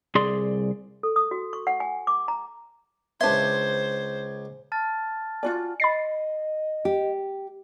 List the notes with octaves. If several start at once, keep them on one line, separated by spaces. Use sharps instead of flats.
C2 G#4 D5 C6
A4
D#6
F#4
C#6
F#5
G#5
D6
A#5
C#2 D4 B4 C5 E5 C6 G#6
A5 F6 A6
F4 F#4 D5 G#5
D#5 B5 A6 C7
G4